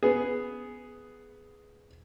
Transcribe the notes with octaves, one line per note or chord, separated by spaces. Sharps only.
B3 G#4